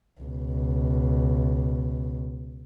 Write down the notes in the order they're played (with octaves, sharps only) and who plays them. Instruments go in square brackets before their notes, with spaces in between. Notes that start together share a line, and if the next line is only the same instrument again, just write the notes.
[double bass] C#2 B2